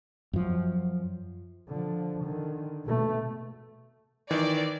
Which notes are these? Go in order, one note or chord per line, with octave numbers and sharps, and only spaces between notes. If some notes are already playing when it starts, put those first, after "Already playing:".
F#2 F3
D3 F3
D3 D#3
B2 A3
D#3 E3 D5